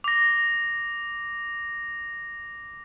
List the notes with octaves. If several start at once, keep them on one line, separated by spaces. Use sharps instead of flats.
D6 A#6